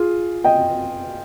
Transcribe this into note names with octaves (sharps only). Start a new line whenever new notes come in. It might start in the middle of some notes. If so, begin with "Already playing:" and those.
Already playing: F4 G#4
D#5 G5